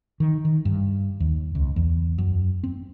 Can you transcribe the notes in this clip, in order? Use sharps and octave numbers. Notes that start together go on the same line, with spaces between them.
D#3
D#3
G2
D#2
C#2
E2
F#2
C4